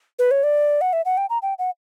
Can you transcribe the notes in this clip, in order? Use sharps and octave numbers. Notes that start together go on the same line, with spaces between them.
B4
C#5
D5
F#5
E5
F#5
G5
A#5
G5
F#5